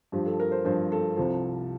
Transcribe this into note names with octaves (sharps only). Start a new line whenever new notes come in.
G2 F3 G4
A4
A#4
C5
G2 F3 C5
A4
C2 C3 F3